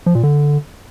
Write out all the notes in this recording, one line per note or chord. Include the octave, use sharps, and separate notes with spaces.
F3
A#2
D3